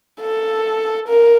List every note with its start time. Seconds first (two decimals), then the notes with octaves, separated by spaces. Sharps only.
0.21 A4
1.08 A#4